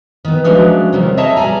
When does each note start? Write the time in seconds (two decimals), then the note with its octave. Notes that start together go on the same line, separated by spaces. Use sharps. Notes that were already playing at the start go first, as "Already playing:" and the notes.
0.25 D#3 B3
0.44 F3 F#3 G#3 A3 C#4 D4
0.92 C3 D#3 F#3 G3 A#3
1.17 G#4 C#5 D#5 E5 A5 A#5
1.36 G3 D5 G#5 A#5